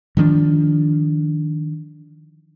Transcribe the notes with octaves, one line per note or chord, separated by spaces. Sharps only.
D#3 F3 G3 D4